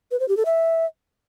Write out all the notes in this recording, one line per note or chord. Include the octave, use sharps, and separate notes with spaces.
B4
C5
G4
A4
E5